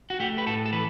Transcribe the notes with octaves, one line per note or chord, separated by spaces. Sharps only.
F#4
A3 G4
B4
A2 A4
A4
E3 B4